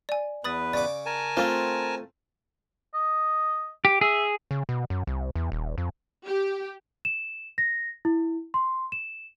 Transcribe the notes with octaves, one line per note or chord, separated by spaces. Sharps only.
D5 G#5
E2 B4 B5 D#6 A6
C#3 D5 D6
A#4 G#5 A5
A3 C4 F4
D#5
G4
G#4 E5
C#3
B2
F#2
C2
E2
D#1
F2
G4
E7
A#6
E4
C6
E7